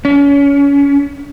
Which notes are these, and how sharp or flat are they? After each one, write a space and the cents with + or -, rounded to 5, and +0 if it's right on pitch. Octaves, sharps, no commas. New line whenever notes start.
C#4 +30